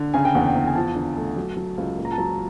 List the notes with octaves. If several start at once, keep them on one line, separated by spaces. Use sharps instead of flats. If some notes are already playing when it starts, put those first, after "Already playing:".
Already playing: D3
C#3 G#5
G5
E2 F#5
G5
E2
G#5
F3 A5
D3
A3
F#3
F#3
C#2
A#2
A#5
A5
F#3 A#5